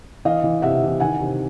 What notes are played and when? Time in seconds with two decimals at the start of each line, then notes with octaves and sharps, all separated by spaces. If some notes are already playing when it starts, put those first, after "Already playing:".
0.25 E3 D#5 F5
0.43 E3
0.62 C3 E5 F#5
0.82 E3
1.00 D#3 F#5 G#5
1.20 C3